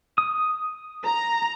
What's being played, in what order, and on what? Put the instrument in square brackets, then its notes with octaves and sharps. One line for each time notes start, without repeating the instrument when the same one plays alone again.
[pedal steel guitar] D#6
[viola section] A#5